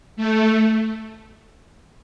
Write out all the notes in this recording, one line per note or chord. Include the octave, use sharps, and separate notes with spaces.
A3